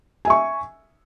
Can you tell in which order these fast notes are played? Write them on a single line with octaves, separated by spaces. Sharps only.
G#5 E5 C#6